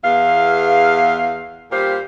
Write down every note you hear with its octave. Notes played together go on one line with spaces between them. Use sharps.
E2 F5
A#2 G3 G4 C5 F5